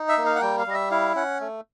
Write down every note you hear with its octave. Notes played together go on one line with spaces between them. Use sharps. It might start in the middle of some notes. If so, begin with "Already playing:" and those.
Already playing: D#4
E5
A#3
F5
F#5
G3 G5
F5
G3 D#5
E5
E4 F5
C#4 F#5
A3